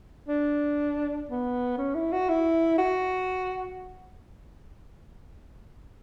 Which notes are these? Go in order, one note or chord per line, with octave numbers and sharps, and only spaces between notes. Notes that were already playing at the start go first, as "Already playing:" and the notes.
D4
B3
C#4
E4
F#4
E4
F#4